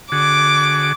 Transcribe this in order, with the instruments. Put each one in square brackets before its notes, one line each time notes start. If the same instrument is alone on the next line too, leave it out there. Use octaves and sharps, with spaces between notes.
[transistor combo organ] D3 F#4 G#4 [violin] D6